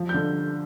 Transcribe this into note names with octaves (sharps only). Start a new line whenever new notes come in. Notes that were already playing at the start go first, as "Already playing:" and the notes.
Already playing: F3
G6
D3